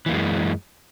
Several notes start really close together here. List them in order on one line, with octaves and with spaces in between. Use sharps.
E3 A#3 F#2 G#3